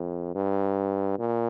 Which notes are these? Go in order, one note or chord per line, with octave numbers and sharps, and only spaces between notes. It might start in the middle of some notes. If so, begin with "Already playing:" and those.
Already playing: F2
G2
A#2